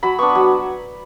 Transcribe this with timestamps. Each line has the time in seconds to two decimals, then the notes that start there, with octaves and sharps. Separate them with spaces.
0.03 F#3 B5
0.18 B3 D4 C#6
0.35 F#3